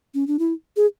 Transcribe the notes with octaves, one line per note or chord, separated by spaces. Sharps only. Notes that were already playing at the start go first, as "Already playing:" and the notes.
C#4
D4
E4
G#4